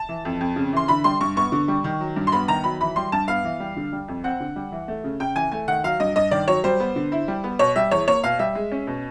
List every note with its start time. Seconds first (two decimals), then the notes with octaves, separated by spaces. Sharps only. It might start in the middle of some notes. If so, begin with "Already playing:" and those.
Already playing: A5
0.09 E3
0.25 F2
0.41 F2
0.56 C#3
0.73 E3 C6
0.88 D3 B5
1.04 G3 C6
1.21 G2 C#6
1.36 B3 C#6
1.52 D3
1.68 G3
1.84 D#3
2.00 F#3
2.16 G2
2.27 C6
2.32 B3 B5
2.48 D#3 A#5
2.64 F#3 B5
2.81 E3 B5
2.96 G3 C6
3.12 G2 A5
3.28 B3 F5
3.44 E3
3.60 G3
3.76 D3
3.92 G3
4.08 F2
4.24 C4 F#5
4.40 D3
4.56 G3
4.72 E3
4.88 A3
5.04 C#3
5.20 C#3 G5
5.36 E3 G#5
5.52 A3 G#5
5.68 D#3 F#5
5.84 F#3 F5
6.00 G2 D#5
6.16 G2 D#5
6.31 D#3 D5
6.48 F#3 C#5
6.64 G3 C5
6.80 B3
6.96 D3
7.12 E4
7.28 G3
7.44 B3
7.59 B2 C#5
7.76 G3 E5
7.91 E2 C#5
8.08 A#3 C#5
8.24 B2 F5
8.39 G3 E5
8.55 G#3
8.71 C#4
8.87 B2